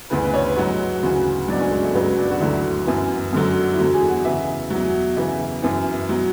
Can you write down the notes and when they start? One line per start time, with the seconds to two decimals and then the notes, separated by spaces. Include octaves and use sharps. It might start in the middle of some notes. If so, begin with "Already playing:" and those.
0.10 D2 C#3 E3 B4
0.22 B4
0.34 C#5
0.45 B4
0.56 G#2 F#3 F#4
1.03 D2 C#3 E3 F#4
1.48 C#2 B2 F#3 D4
1.60 C#4
1.71 G#3
1.83 A3
1.94 C#2 C#3 F#3 B3
2.18 D4
2.31 F#4
2.40 D2 D3 F#3 E4
2.86 F#2 E3
3.33 F#2 D3 F#3
3.74 E4
3.78 E2 D3 F#3 F#4
3.94 G#4
4.09 F#4
4.24 E2 C#3 E3 E5
4.70 E2 B2 F#3
5.17 E2 C#3 E3 E5
5.62 F#2 E3
6.09 B2 F#3